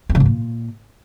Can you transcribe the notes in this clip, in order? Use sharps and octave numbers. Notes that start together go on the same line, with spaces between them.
F2
C#3
G#2
A#2